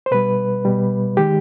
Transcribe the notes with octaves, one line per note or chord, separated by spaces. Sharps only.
C5
B2 G3 B4
B2 G3
D#3 G#3 G4